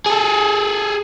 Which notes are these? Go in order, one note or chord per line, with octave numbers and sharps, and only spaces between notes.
G#4 A4